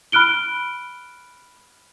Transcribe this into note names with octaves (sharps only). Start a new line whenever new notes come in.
B5 F6 F#6 D7 G7